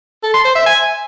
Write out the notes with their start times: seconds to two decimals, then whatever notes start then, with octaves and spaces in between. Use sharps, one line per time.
0.23 A4
0.34 C6
0.45 C5
0.55 E5
0.66 G#5